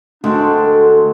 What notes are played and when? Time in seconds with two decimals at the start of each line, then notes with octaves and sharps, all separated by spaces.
0.24 D2 G#3 C4 D4 F#4
0.66 A4